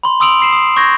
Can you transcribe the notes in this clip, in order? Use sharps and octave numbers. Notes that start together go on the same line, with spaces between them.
B5 C6
C6 D#6 E6 D7 F7 F#7
B5 C7 E7
D#6
C#6 G6 G#6 A#6